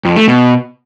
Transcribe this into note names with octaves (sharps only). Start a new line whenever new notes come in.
F2
A3
B2